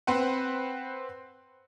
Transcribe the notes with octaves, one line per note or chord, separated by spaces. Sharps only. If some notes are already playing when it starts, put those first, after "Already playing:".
C4 B4 C5 F#5